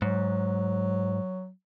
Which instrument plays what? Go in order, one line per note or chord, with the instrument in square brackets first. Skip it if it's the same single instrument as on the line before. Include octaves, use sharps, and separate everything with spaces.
[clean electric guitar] G#2 [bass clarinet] F#3